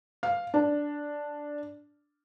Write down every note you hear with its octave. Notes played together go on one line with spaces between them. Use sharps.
F5
D4